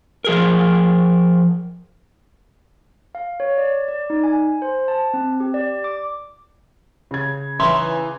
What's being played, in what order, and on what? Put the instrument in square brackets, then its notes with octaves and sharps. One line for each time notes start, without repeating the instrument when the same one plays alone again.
[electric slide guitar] F3 G#4 A#4
[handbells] F5
C#5
D5
D5
D#4
G#5
C5
A5
C4
G4
D5
D6
[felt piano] C#3 G#6
[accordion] E3 [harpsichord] C#4 D#4 E4 [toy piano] C6